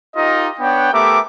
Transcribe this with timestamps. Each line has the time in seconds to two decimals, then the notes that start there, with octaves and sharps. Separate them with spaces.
0.16 D#4 F4 G4 A#4 D#5
0.60 B3 D4 C#5 F#5 G5
0.92 A3 B3 G4 A#4 E5 D6